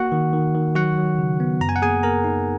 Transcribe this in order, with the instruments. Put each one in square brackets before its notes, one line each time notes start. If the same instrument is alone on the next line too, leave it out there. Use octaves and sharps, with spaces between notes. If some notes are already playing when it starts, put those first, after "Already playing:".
Already playing: [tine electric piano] A#3 F#4 F#5
D#3
D#3
D#3
F#3 F#4 F#5
F#3
C#3
B3
F#2 A#5
G#5
F#5
A#3 G#4 G#5
A#3 A#4 A#5
D#4